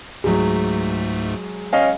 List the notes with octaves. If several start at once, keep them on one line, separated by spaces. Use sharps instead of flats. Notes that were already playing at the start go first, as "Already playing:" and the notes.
C#2 G#2 F#3 G#3 A3
C#4 D#5 F5